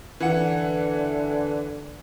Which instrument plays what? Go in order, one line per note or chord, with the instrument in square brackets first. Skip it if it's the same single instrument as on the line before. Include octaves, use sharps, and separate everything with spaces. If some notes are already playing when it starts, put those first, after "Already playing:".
[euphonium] D3 [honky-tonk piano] E3 F#5